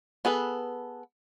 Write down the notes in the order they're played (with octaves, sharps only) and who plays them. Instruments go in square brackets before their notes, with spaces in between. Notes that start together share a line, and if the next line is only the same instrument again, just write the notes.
[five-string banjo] B3 G#4 A4 B4